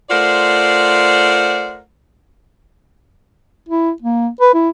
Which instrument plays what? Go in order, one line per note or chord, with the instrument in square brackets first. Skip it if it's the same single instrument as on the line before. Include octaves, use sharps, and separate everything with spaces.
[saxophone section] A3 F4 A#4 C5 D5 F#5
[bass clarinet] E4
A#3
B4
E4